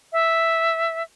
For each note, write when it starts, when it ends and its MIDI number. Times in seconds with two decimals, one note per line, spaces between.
0.12 1.03 76